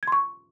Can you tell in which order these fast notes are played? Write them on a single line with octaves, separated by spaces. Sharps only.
G#6 C6 C#6